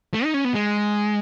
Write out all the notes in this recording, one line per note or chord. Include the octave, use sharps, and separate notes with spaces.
A3
D#4
C#4
B3
G#3